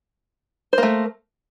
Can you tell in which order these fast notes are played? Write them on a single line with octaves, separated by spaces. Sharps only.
C5 A#3 A3